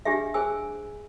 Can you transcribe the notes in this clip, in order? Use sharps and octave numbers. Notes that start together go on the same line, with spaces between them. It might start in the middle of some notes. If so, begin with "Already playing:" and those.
D4 G4 G#4 E5
G#4 C5 G#5 E6